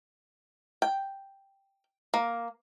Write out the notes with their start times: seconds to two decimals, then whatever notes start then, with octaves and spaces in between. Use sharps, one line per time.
0.82 G5
2.14 A#3